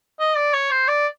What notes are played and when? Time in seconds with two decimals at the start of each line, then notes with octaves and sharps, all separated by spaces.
0.19 D#5
0.36 D5
0.53 C#5
0.71 C5
0.88 D5